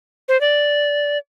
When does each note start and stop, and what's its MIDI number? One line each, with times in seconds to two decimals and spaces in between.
0.29 0.39 72
0.41 1.18 74